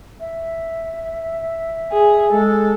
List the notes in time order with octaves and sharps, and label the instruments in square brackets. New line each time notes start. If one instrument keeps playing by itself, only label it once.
[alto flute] E5
[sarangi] G#4
[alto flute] G#3 [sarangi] A4